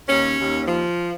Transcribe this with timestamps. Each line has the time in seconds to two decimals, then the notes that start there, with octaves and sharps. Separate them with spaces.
0.08 D#2 C#4
0.38 D#2
0.67 F3